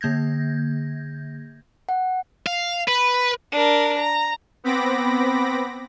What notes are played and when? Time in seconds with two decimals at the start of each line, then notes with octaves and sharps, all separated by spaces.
0.01 D3 A#3 G6 G#6 A#6
1.89 F#5
2.47 F5
2.88 B4
3.52 D4 A#4
3.98 A#5
4.64 B3 C4 B5 D6 A#6